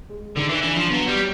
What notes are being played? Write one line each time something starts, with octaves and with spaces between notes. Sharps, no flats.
G#3
D3 D#3
E3
E3 D4
F3
F#3 B3
G3
F#3